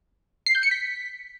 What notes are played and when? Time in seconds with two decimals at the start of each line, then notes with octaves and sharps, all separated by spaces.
0.46 C7
0.55 G6
0.63 C#7
0.71 B6